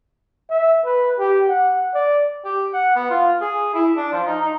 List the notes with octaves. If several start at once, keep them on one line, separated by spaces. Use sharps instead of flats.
E5
B4
G4
F#5
D5
G4
F#5
B3
F4
G#4
E4
D4
F3
D#4
D#4